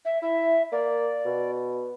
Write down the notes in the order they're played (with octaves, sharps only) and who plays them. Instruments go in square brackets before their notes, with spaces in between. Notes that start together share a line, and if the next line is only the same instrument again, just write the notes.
[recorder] E5
[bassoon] E4 [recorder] E5
[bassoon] A#3 [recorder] D5
[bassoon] B2